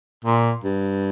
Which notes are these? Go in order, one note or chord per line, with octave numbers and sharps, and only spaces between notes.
A#2
G2